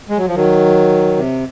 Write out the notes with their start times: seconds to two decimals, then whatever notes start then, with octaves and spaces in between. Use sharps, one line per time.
0.09 G#3
0.18 F#3
0.27 F3
0.35 D#3 F#3
1.16 C3